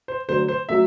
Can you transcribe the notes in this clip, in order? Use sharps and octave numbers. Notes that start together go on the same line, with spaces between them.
C5
D3 F#3 A3 C5
C5
F#3 A3 E5